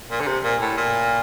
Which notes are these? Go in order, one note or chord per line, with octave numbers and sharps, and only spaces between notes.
A#2
D3
C3
A#2
A2
A#2